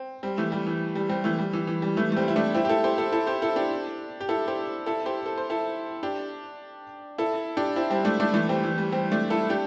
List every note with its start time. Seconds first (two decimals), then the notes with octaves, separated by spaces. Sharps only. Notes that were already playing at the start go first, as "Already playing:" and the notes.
Already playing: C4
0.23 G3 C4
0.38 E3 A3
0.52 G3
0.67 E3
0.95 G3
1.09 G3 C4
1.24 E3 A3
1.39 G3
1.53 E3
1.67 E3
1.82 G3
1.97 E3 A3
2.12 A3
2.16 G3 C4
2.28 E4
2.36 A3 D4
2.54 C4 E4
2.65 G4
2.69 E4 A4
2.84 G4 C5
2.98 E4 A4
3.12 E4 A4
3.27 G4 C5
3.42 E4 A4
3.56 D4 G4
4.21 G4
4.29 E4 A4
4.47 G4 C5
4.86 E4 A4
5.06 G4 C5
5.26 A4
5.37 C5
5.50 E4 A4
6.03 D4 G4
7.18 E4 A4
7.57 D4 G4
7.76 C4 E4
7.90 G3 C4
8.05 A3 D4
8.20 A3 D4
8.34 E3 A3
8.49 G3 C4
8.63 E3
8.78 G3
8.92 G3 C4
9.12 A3 D4
9.30 E4 A4
9.50 D4 G4